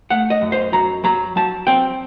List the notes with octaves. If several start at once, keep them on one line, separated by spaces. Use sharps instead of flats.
A3 F#5
D#5
F#2
C5
F#3 A#5
F#3 A#5
F#3 A5
C4 G5